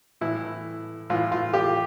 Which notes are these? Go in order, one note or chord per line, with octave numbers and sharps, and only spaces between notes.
A2 E3 E4
A2 E3 F4
F4
G4